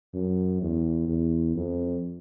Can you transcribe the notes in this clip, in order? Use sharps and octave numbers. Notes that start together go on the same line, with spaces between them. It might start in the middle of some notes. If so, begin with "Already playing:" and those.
F#2
E2
E2
F2